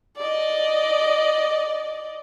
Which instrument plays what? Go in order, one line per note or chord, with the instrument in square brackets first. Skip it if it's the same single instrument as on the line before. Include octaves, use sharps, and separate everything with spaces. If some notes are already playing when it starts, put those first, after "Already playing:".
[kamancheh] D5 D#5